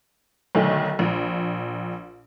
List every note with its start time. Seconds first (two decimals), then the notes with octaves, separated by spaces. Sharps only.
0.55 B1 D3 D#3 A3
0.99 A#1